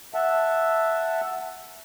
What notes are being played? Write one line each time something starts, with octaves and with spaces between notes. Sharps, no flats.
E5 F#5 A5